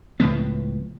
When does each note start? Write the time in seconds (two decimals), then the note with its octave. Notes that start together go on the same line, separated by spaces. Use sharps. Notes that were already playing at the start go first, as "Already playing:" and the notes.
0.20 C#2 A2 F3 B3